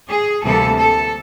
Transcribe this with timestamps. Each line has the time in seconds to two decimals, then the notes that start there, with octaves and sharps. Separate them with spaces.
0.09 G#4
0.43 D2 C3 E3 G3 A#3 A4
0.77 A4